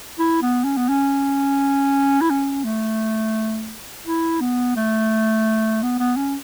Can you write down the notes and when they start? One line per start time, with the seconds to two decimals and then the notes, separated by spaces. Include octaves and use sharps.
0.19 E4
0.42 B3
0.64 C#4
0.77 B3
0.89 C#4
2.21 E4
2.30 C#4
2.64 A3
4.06 E4
4.40 B3
4.76 A3
5.83 B3
5.99 B3
6.17 C#4